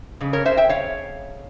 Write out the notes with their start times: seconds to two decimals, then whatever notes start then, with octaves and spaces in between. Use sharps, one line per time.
0.20 F2 C#3
0.33 A#4 C#5
0.45 C5 E5
0.57 E5 G5
0.69 C#5 F5